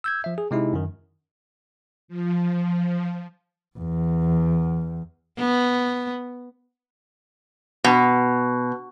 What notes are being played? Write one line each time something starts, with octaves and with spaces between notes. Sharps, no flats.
E6 G6 G#6
F3 E5
G#4
C3 G#3 D#4 E4
F#2 D#3
F3
E2
B3
B2